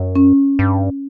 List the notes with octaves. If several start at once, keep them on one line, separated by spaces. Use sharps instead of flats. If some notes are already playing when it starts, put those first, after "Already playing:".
Already playing: F#2
C#4
G2